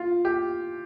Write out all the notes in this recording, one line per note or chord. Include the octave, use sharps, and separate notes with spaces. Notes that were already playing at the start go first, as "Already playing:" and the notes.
Already playing: F4
G4